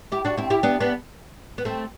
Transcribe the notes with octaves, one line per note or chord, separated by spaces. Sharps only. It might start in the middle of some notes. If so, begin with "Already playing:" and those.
E4 G4
D4 F#4
C4 E4
E4 G4
B3 D4
B3 D4
B3
A3 C4